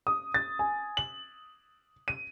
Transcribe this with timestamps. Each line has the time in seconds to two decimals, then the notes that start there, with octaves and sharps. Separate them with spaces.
0.07 D#6
0.34 A6
0.59 G#5
0.97 F#7
2.08 D#7